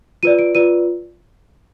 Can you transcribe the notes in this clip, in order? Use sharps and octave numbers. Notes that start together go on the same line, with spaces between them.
F4 B4 D5 D#7
D7
F4 B4 D5 D#7